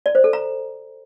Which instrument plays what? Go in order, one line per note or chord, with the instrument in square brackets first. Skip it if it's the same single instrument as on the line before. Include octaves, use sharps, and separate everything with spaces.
[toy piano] D5
C5
A4
A#5